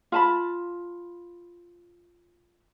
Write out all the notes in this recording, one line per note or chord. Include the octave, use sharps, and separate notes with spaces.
F4 A5 B5